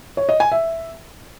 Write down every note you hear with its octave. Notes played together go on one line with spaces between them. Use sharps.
C#5
D#5
G#5
E5